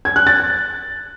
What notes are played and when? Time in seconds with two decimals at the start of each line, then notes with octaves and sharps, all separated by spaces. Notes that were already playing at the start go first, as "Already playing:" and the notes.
0.05 G#6
0.16 F#6
0.27 A6